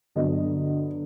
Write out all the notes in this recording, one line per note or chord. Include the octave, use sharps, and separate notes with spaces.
G2 D3 F#3 B3 D#5